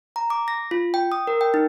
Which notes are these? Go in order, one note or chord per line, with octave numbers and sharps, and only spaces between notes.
A#5
D6
A#6
F4
G5
D#6
A#4
G5
D#4